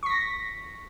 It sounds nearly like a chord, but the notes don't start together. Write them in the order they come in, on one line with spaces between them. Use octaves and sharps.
C#6 B6 A#6